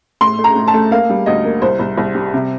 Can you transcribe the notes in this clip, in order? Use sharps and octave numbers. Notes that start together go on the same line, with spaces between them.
A2 C6
A3
A#5
A2
A5
A3
A#3 F5
G3
D2 D#5
A#3
C2 C5
C2
C2
G3
C3